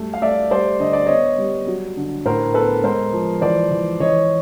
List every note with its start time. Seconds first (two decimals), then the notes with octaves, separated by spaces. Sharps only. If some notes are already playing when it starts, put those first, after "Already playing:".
Already playing: F#2 G3 A3
0.14 F5
0.22 A3 D5 E5
0.51 G3 C5 D5
0.80 D3 D#5
0.93 D5
1.06 B3 C#5 D#5
1.38 G3
1.67 F#3
1.97 D3
2.26 A2 A#4 C5
2.54 B3 A4 B4
2.83 G#3 A#4 C5
3.13 F3
3.41 E3 C5 D5
3.71 E3
4.00 E3 C#5 D#5